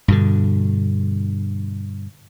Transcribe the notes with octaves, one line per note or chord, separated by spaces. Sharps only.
G2 B2 D3